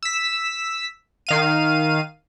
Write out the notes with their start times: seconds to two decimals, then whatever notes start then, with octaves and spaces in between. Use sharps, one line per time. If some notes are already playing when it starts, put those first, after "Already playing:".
0.03 E6 B6
1.27 D#3 F5 D#7